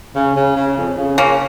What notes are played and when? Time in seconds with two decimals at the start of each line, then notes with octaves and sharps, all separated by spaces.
0.15 C#3
0.35 C#3
0.56 C#3
0.76 F2
0.97 C#3
1.17 C#3 A#3 C#4